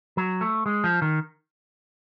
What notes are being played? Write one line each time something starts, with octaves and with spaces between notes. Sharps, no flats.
F#3
A3
G#3
F3
D#3